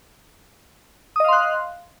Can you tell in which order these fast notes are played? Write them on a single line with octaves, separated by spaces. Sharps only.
D#6 D#5 F5 C6 F#6